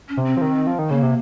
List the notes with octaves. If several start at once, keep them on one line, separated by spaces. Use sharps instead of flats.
C#4
C3
C4
F3
D#3
F3
D#3
C#3 A#3
C3